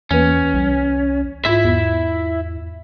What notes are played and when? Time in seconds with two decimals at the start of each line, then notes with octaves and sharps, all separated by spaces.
0.11 E2 E3 A#3 C#4 B4
0.54 C2
1.45 G#2 E4 F4 E5
1.64 E2 B3